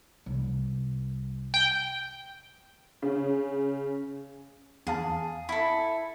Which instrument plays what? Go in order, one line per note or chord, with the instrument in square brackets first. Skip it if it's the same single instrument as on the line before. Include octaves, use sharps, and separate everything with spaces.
[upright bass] C2
[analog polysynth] G5
[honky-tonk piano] C#3
[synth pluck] E2 F5 A5 [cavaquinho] G#4
[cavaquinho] E4 A4